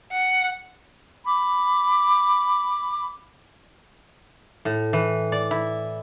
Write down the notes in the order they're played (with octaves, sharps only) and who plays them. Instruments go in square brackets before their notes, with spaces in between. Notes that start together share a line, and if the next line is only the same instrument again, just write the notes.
[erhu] F#5
[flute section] B5 D6
[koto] A2
E3
D5
E4